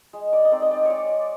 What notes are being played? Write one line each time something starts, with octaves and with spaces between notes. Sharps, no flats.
G#3
D5
D#5
C4 D#4 D5
D#5
D5
C#5
G#3 D5